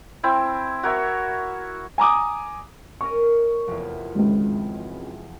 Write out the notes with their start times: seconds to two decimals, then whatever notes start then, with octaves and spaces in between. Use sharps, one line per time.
0.23 C4 E4
0.83 F#4 A#4 C#5 E5
1.98 G#5 A#5 D6 D#6
3.01 C#4 A#4 D#5 C#6
3.68 F1 E2
4.15 G#1 C#2